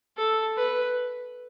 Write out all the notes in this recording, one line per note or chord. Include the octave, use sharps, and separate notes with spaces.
A4
B4